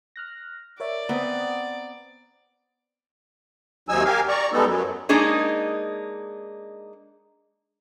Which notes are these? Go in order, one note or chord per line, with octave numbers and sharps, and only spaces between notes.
F6 F#6 A#6
A#4 C#5 D5 E5
B3 C4 A#5 D#6
D#2 C3 F#3 D#4 G#5 E6
G4 A#4 F5 G#5
D5 A#5 C#6
G3 G#3 B3 D#4 A4
F#2 F#3
G#3 A#3 D4 D#4 G#4 C#5